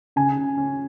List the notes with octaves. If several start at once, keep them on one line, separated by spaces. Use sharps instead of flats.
C#3 G#5
C#3
C#4